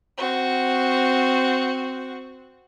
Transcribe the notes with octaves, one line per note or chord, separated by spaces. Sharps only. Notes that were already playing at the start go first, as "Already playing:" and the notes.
C4 F#4